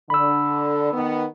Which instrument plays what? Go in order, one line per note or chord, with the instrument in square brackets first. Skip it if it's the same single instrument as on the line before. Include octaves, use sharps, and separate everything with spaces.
[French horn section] D3 [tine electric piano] B5 E6
[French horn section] D#3 B3